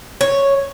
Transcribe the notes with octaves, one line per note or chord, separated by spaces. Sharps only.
C#5